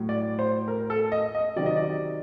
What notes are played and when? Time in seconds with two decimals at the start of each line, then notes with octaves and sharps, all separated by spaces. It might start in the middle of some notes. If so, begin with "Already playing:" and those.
Already playing: A2 F#3
0.09 D5
0.39 C5
0.68 A#4
0.90 A4
1.12 D#5
1.35 D#5
1.56 C3 D#3 F#3 D5
1.66 D#5
1.76 D5